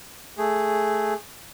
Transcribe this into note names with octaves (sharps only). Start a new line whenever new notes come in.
A3 G#4